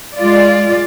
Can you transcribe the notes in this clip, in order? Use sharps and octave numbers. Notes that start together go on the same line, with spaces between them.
G#3 F4 D5